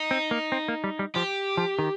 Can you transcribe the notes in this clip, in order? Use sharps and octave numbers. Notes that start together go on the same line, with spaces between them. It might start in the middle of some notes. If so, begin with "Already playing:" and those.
Already playing: D#4
C4
A#3
C4
A#3
G3
G3
F3 G4
F3
D#3